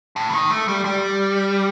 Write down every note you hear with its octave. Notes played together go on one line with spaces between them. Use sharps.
A2
E3
D#3
A3
G3
G3